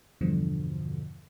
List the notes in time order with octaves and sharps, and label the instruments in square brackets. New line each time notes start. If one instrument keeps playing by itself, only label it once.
[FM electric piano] E2 G2 B2 D3 F3